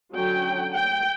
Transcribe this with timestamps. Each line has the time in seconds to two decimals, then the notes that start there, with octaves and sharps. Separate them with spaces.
0.15 D3 F#3 C#4 G5
0.74 G5